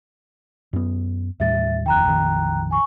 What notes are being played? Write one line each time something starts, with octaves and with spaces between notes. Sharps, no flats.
F#2 B3
D#2 A2 G3 E5 A6
F1 D#2 G5 A#5 F#6
A#1 F2 D#3
G#5 C#6